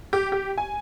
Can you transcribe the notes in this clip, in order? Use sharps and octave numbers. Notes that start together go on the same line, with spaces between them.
G4
G4
G#5